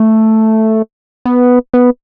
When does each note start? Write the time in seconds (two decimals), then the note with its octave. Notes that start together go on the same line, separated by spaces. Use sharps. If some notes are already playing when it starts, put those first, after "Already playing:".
Already playing: A3
1.25 B3
1.74 B3